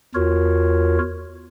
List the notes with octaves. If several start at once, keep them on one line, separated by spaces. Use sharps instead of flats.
E2 F4 F#4 A#4 C#5